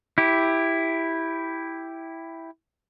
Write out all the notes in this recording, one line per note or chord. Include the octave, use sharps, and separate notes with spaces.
E4 G4